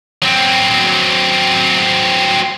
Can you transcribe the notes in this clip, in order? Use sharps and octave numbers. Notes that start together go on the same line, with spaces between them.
F#3 C4